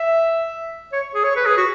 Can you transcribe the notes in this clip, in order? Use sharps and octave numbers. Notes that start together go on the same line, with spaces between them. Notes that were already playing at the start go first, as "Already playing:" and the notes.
Already playing: E5
C#5
G#4
C#5
B4
G#4
F#4